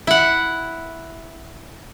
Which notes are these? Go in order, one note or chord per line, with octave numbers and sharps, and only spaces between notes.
E4 F#5